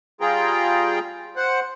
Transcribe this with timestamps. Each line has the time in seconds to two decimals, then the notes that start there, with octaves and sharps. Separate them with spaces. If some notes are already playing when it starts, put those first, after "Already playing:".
0.21 G3 F4 G#4 G5 A#5
1.36 C5 F#5